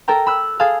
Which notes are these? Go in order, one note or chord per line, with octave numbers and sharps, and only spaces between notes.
A4 A#4 G5 A#5
B5 E6 F#6
G#4 A4 F5